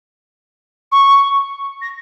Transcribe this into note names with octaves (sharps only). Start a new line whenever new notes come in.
C#6
A#6